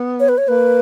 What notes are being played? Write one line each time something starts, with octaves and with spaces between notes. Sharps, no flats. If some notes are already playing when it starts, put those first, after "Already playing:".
Already playing: B3
C#5
B4
C#5
A#3 B4